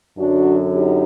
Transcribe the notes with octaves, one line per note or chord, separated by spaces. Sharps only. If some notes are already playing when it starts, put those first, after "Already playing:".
F#2 D3 F#3 D4 F#4
D#4 G4